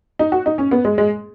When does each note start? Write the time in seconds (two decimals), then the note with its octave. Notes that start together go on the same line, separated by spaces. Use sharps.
0.19 D#4
0.32 F#4
0.46 D#4
0.58 C#4
0.71 B3
0.85 G#3
0.98 G#3